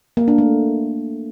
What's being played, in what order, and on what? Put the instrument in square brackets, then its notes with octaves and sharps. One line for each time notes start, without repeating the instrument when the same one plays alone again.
[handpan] A#3
D4
A3